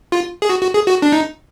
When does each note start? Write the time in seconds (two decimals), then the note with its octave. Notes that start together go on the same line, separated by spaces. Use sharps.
0.12 F4
0.42 G#4
0.49 F#4
0.62 F#4
0.74 G#4
0.87 F#4
1.02 D4
1.12 D#4